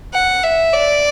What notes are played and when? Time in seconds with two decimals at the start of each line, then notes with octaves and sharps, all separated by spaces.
0.14 F#5
0.44 E5
0.73 D5